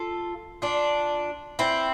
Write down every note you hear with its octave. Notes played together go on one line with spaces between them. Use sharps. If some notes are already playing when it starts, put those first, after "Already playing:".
Already playing: F4 A4
D4 F4
C4 E4